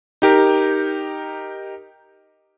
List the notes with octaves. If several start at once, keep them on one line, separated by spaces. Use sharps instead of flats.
D#4 G4 A#4